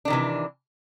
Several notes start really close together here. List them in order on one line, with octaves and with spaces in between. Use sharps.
D4 D#3 C3 E3